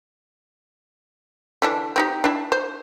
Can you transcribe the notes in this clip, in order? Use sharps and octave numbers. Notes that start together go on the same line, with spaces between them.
D3 E3 D4
C4 D#4 G4
D4 E4
C5